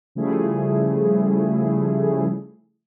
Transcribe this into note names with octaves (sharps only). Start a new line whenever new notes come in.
C#3 F3 G3 A3 E4 G#4